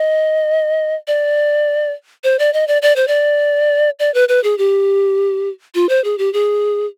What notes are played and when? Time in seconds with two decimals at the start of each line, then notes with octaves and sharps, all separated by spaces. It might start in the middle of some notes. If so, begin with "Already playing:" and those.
Already playing: D#5
1.07 D5
2.24 C5
2.39 D5
2.53 D#5
2.68 D5
2.82 D5
2.96 C5
3.08 D5
3.99 D5
4.14 B4
4.29 B4
4.44 G#4
4.58 G4
5.75 F4
5.89 C5
6.04 G#4
6.18 G4
6.33 G#4